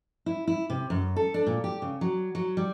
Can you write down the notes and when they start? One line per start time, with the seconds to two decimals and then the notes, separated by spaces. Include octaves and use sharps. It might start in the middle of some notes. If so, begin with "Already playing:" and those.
0.26 E4
0.47 E4
0.70 C3
0.90 F#2
1.16 A4
1.34 D4
1.47 A#2
1.64 G4
1.82 C#3
2.01 F#3
2.35 F#3
2.57 G3